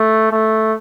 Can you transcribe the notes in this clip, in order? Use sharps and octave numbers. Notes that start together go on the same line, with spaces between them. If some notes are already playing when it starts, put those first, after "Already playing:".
Already playing: A3
A3